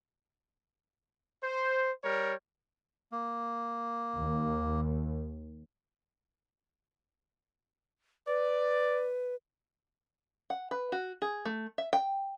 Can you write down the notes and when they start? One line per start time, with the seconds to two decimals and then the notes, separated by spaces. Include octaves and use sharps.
1.43 C5
2.04 G3 A#4 C#5
3.12 A#3
4.17 D#2
8.27 B4 D5
10.50 F#5
10.71 B4
10.92 F#4
11.22 G#4
11.45 A3
11.78 E5
11.93 G5